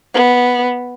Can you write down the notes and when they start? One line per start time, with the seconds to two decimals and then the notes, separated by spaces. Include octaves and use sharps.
0.15 B3